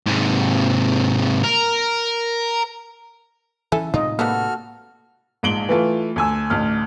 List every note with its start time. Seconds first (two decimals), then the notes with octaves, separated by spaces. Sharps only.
0.06 G#2 C3
1.44 A#4
3.72 E3 C#4 E4 A4 G#5
3.94 A2 C3 G#3 D#4 F4 D#5
4.19 F#3 G3 A#3 B3 F#4 A4 F6
5.43 A#1 G#2 D7 F#7 G7
5.69 E3 A3 F4
6.16 D2 G#5 E6
6.50 A1 D2 F6